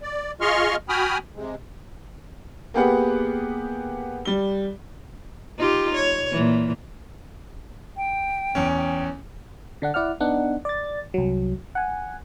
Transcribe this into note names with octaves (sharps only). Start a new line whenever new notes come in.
D5
F4 G#4 D#5 C6 C#6 F6
F#4 G5 G#5 B5 D#6 F6
C3 G#3
A#3 B3 G4 G#4 B4 F#5
G3 G7
D#4 F4 G4
C#5
A#2 E3
G5
E2 C#4
G5
D3 D4 F#5
E4 D5 F#5 F6
B3 D4 D#4 F#5
D5 A6
C2 F#3
F#5 G#5